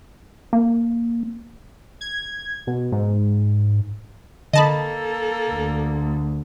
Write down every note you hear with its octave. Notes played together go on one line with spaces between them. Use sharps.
A#3
G#6
B2
G#2
D3 A#3 A4 D#5 A5 B5
D2